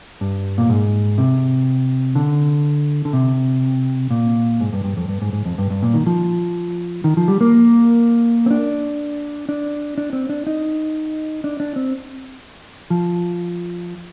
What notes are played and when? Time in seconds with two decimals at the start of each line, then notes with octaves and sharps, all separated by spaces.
0.21 G2
0.58 A#2
0.70 G#2
1.18 C3
2.15 D3
3.05 D3
3.13 C3
4.11 A#2
4.61 G#2
4.73 G2
4.84 G2
4.97 F2
5.09 G2
5.22 G#2
5.33 G#2
5.46 F2
5.58 G2
5.70 G2
5.83 A#2
5.94 D#3
6.06 F3
7.04 D#3
7.17 F3
7.28 G3
7.41 A#3
8.46 C4
8.51 D4
9.49 D4
9.98 D4
10.13 C4
10.29 D4
10.47 D#4
11.44 D4
11.60 D4
11.76 C4
12.90 F3